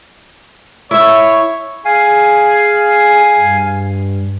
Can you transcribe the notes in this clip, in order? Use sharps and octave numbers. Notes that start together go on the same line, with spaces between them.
E4 C#5 E5
G#4 F5 G#5
G2